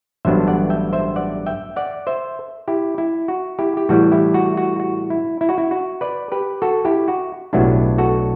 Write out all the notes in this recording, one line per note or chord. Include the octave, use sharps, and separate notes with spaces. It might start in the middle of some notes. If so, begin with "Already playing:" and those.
A1 G2 F#3 B3 D4 C5 E5
D5 F#5
E5 G5
C5 E5
D5 F#5
E5 G5
D5 F#5
C5 E5
E4 G4
E4
F#4
E4 G4
G4
A2 E3 G3 F#4
E4 G4
F#4
F#4
F#4
E4
E4
F#4
E4
F#4
B4 D5
G4 B4
F#4 A4
E4 G4
F#4
B1 A2 F#3 B3 D4 E4 G4
F#4 A4